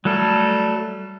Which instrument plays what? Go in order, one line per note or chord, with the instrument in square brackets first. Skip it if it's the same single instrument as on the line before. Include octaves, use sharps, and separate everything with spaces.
[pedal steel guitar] F#3 A3 A4 [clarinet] G3